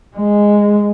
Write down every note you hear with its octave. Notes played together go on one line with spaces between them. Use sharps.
G#3